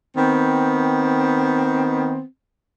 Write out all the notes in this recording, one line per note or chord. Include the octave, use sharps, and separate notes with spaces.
D#3 B3 C4